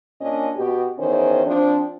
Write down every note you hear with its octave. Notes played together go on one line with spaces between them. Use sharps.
A#2 C#4 D4 D#5
B2 F#4 G4
E2 D#3 C#4 C5
F3 C4 D4